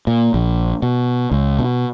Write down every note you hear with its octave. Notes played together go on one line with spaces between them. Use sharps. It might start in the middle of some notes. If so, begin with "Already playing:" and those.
A#2
A#1
B2
C#2
B2